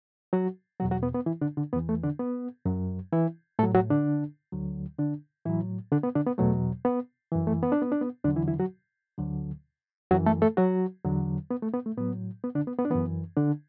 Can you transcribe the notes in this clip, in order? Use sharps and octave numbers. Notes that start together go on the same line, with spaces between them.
F#3 F#4
E2 B2 F#3 F#4
F#3 F#4
B3
B3
E3 E4
D3 D4
D3 D4
E2 E3 B3
A3
D3 D4
B3
F#2 F#3
E3 E4
A2 F#3 A3 A4
F#3 F#4
D3 D4
D2 D3 F#3
D3 D4
A2 E3 F#3 E4
D3 D4
B3
D3 D4
B3
E2 B2 F#3 A3
B3
F#2 E3
A3
B3
D4
B3
D4
B3
E2 D3 F#3 D4
E3 E4
E3 E4
F#3 F#4
D2 D3 F#3
F#2 E3 F#3 F#4
A3 A4
A3 A4
F#3 F#4
E2 D3 F#3
B3
A3
B3
A3
A2 F#3 B3
B3
D3 D4
B3
B3
D4
F#2 E3 B3
D3 D4